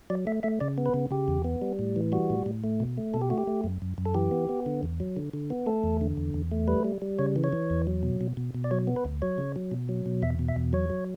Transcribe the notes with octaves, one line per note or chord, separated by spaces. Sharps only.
F#3 D5
A3 E5
A3 E5
C#3 D5
B3
B4
C#3
C#3 G4
E2
B3
G3
A2
E3
G3 F#4
A2
A2
A3
B2
A3
B2 A4
G4
A3 F#4
G4
A3
F#2
F#2
F#2
A4
E3 G4
B3
B3
D3
E2
F#3
D3
D3
B3
A3 A4
E2
D3
E2
E2
A3
G3 B4
G3
G3
C#3 C#5
E3
C#5
E3
E2
F#3
B2
B2
B2
B2
D5
F#3 C#5
B3
B4
D2
F#3 C#5
C#3
F#3
B2
F#3
B2
E2 E5
B2
E5
E2
F#3 C#5
F#3